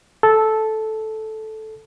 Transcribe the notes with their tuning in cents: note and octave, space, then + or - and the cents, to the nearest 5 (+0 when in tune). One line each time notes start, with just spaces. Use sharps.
A4 -10